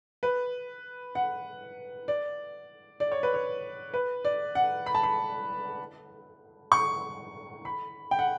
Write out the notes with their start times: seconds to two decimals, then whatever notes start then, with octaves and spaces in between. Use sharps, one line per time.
0.23 B4
1.15 F#5
2.08 D5
3.00 D5
3.12 C#5
3.23 B4
3.34 C#5
3.94 B4
4.25 D5
4.55 F#5
4.86 B5
4.95 A5
5.03 B5
6.72 C#6
7.65 B5
8.11 G5
8.19 F#5